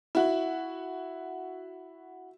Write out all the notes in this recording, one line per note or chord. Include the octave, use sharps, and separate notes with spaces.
E4 F#4